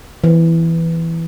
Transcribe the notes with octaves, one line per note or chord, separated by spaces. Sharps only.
E3